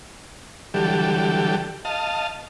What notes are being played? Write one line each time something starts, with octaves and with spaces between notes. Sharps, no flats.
D3 E3 F#3 G3 G4 A4
D#5 F5 A5